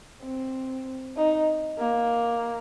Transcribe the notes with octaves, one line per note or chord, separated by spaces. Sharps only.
C4
D#4
A#3